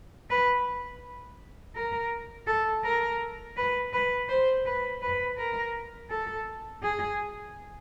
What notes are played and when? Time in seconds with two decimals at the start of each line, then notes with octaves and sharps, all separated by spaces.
0.30 B4
1.75 A#4
2.47 A4
2.84 A#4
3.57 B4
3.93 B4
4.29 C5
4.66 B4
5.02 B4
5.38 A#4
6.10 A4
6.83 G#4